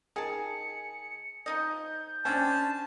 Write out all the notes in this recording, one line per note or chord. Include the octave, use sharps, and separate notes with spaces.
D#3 G#4 A5 C#7
F3 D#4 D#5 G6
C#4 D4 C5 E5 G5 A5